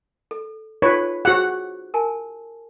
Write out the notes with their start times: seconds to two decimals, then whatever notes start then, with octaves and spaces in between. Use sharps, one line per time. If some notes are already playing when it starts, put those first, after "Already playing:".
0.31 A4
0.82 D#4 F4 A4 B4 C#5
1.25 F#4 G#4 C5 F#5
1.94 A#4 G#5 A5